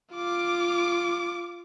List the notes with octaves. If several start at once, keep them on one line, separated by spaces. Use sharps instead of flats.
F4 D6